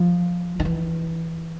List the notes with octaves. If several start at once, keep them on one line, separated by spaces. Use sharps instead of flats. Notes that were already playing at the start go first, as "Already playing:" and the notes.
Already playing: F3
D#3
E3